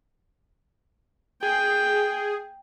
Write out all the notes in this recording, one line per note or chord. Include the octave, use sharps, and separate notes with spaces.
G#4 G5